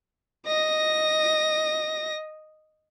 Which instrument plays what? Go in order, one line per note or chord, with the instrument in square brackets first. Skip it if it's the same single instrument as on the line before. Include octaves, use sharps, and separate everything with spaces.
[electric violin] D#5 A#6